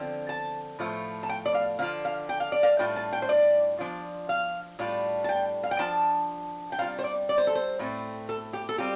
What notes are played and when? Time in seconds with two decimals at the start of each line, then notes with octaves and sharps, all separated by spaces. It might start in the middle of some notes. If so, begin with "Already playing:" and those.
Already playing: D3 F3 C4
0.29 A5
0.79 A2 F3 A3 F4
1.23 A5
1.29 G5
1.46 D5
1.54 F5
1.79 D3 F3 D4 F4 F5
2.05 F5
2.29 G5
2.40 F5
2.52 D5
2.63 F5
2.79 A2 G3 D4 F4 G5
2.96 A5
3.13 G5
3.22 C5
3.29 D5
3.79 F3 D4 F4
4.29 F5
4.79 A2 G3 D4 F4
5.24 A5
5.29 G5
5.64 F5
5.71 G5
5.79 F3 D4 F4 A5
6.72 G5
6.79 C3 G3 F4 F5
6.99 C5
7.04 D5
7.29 D5
7.38 C5
7.47 A4
7.55 C5
7.79 A2 A3 C4
8.29 A4
8.53 G4
8.69 A4
8.78 G3 C4 F4 G4